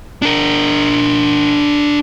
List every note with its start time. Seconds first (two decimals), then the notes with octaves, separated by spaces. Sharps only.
0.22 D4 A#4